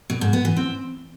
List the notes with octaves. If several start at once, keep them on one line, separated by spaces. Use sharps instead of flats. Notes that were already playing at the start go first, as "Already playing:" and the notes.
B2
G#2
B3
E3
C4